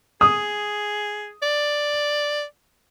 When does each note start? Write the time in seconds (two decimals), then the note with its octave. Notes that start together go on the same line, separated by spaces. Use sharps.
0.21 G#4 D#6
1.43 D5